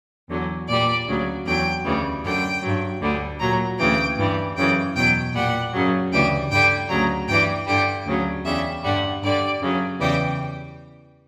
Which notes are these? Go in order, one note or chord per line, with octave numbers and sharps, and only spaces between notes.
E2 D3 F#3
A#2 G3 D5
D2 C#3 F#3
E2 D3 F#3 G5
D2 C#3 E3 G3
F#2 D3 F#3 G5
G2 F#3
D2 D3 G3
A#2 F#3 A#5
D2 C#3 E3 G5
G2 E3 G3
F#2 C#3 E3 G5
E2 B2 F#3 G5
A#2 G3 F#5
F#2 C#3 F#3
D2 C#3 E3 G3 G5
G2 D3 G3 G5
D2 C#3 F#3 A#5
G2 E3 G3 G5
G2 D3 G3 G5
D2 C#3 F#3
E2 C#3 G3 E5
G2 D3 G3 F#5
G2 D3 G3 D5
F#2 C#3 F#3
E2 C#3 E3 G3 G5